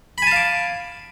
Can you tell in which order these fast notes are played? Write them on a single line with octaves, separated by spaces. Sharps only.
B5 G#5 A5 F5 D6